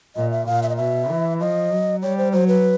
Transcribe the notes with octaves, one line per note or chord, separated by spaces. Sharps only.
A#2 D#5
E5
A#2 F5
E5
D#5
B2 E5
E3
F3 D#5
F#3
G3 C#5
C5
F#3 C5
B4